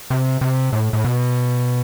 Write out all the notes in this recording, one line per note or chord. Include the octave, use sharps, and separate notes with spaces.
C3
C3
A2
A2
B2